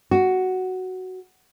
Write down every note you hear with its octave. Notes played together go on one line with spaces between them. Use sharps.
F#4